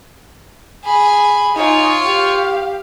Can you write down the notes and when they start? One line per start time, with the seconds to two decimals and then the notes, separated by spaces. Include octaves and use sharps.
0.85 G#4 B5
1.56 D#4 F4 C#5 G#5
2.01 G4 F5